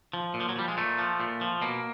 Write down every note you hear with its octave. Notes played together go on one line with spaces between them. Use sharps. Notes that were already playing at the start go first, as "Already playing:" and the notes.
F3
A#2
F3
F#3
F3 G3
G#3
A#2 A3
F3
A#2
F3
B2 A#3